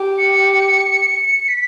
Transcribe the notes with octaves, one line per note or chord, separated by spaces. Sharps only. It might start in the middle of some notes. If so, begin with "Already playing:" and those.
Already playing: G4
C#7
B6